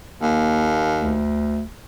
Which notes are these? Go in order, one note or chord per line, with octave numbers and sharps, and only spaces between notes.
D#2 A#3
D2